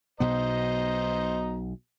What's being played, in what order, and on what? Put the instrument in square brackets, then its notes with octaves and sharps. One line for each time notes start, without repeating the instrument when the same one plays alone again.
[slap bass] B1 B2 B3 [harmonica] C5 D#5 A#5